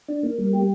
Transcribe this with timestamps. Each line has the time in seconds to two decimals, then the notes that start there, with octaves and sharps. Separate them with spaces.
0.09 D4
0.23 A#3
0.38 G3
0.53 G4